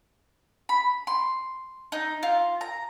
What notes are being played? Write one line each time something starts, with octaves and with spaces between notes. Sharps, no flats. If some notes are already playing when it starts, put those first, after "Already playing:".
B5
C6
D#4
F4
A#5